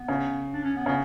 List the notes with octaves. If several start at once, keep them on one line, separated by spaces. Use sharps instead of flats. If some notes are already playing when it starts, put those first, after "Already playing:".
Already playing: B3
C#3
D4
C#4
B3
C#3 B3